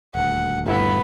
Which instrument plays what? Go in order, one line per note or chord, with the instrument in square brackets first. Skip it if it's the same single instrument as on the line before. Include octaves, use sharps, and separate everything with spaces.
[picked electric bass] D#1 D2 [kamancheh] F#5
[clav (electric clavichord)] G1 E4 E5 [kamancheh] B3 B5